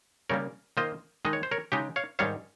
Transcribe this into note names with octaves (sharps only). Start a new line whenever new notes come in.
C#3 G3 A#3 A#4 C#5
D#3 A#3 F4 C5 D#5
D#3 G#3 D#4 D#5
C#5
C5
A#4 C#5
C#3 G#3 D#4 G4
C#5 F5
G#2 D#3 G3 C#5 F5